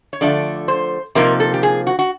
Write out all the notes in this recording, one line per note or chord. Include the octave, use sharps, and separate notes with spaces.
C#5
D3 F3 A3 D5
C5
C3 F3 A#3 D#4 A#4
A4
G4
G#4
F#4
F#4